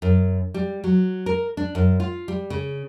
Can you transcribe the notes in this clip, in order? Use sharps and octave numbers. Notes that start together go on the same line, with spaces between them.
F#2
G3
F#3
A#4
D4
F#2
F4
G3
C#3